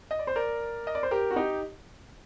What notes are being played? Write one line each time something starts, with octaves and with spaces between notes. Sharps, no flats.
D#5
D5
C5
A#4 D5
D#5
D5
C5
G4 A#4
F#4
D#4 G4